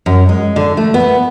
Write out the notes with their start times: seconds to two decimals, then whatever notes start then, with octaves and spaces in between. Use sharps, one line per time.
0.06 F#2
0.29 G#3
0.56 D3
0.77 A3
0.94 B3